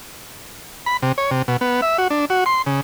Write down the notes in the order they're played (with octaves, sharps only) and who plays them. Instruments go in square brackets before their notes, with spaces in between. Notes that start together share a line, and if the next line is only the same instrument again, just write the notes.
[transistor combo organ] B5
C3
C#5
C3
B2
B3
E5
F#4
D4
F#4
C6
C#3